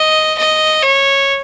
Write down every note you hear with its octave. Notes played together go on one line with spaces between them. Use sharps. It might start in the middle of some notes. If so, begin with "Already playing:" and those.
Already playing: D#5
D#5
C#5